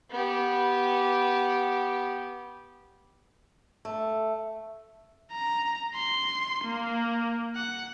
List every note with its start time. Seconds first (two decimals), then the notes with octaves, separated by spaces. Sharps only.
0.11 B3 G4
3.85 A3
5.32 A#5
5.95 C6
6.65 A#3
7.55 F#5